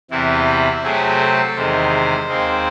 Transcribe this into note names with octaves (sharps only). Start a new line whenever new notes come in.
E2 C3 E3 E4
C3 F#3 A3 C4 G#4
A4
E2 C3 D#3 G#3 C5
D#2 D#3 G#3 C4